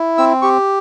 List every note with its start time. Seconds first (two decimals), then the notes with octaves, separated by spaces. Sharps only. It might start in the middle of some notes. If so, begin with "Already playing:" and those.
Already playing: E4
0.18 C4 E6
0.42 G4 C#6